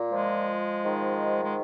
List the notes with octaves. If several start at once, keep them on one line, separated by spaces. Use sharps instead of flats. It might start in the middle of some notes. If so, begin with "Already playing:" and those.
Already playing: A#2
F3 G#3
G#2 D#3
G#3